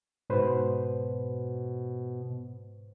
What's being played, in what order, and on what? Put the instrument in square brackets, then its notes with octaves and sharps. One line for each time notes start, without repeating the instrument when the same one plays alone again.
[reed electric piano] G#2 B4 C5 [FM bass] B2